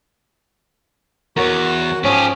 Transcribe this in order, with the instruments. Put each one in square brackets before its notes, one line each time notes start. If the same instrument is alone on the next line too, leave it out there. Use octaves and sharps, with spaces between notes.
[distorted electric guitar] E2 [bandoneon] F#4 [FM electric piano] A#4 C#5
[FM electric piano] G#2 C#5 D#6 [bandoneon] F3 C#4 [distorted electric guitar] G4 G#4